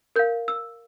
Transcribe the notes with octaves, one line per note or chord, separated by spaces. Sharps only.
A#4 F5 G6
E6